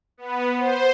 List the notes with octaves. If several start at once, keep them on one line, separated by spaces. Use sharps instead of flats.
B3
C5